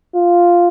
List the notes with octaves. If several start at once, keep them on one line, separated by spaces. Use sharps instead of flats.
F4